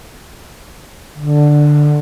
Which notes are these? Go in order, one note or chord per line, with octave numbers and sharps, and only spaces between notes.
D3